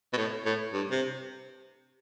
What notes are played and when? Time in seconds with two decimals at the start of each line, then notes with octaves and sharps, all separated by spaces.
0.13 B2
0.17 A2
0.45 A2
0.73 G2
0.91 C3